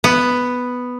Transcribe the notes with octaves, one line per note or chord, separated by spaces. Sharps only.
B3